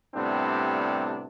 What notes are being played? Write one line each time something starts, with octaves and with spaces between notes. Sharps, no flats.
A2 C3 G3 B3 C4 D4